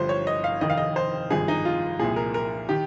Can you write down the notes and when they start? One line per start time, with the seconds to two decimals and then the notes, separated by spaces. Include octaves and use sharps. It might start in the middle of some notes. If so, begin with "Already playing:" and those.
Already playing: G1 G2 F3 C5
0.09 C#5
0.27 D#5
0.44 F5
0.61 F1 F2 D#3 D#5
0.70 F5
0.77 D#5
0.96 C5
1.30 G#1 G2 F3 G#4
1.48 D#4
1.65 F4
1.99 C2 A#2 F3 G#4
2.16 A#4
2.34 A#4
2.69 D#3 G4